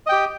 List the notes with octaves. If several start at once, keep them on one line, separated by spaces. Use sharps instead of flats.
G4 D#5 G5